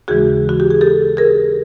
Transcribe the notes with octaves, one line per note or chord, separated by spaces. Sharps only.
D#2 C#3 E3 G#3 F#4 G#4
F#4
G4
G#4
G4 A4
G#4 A#4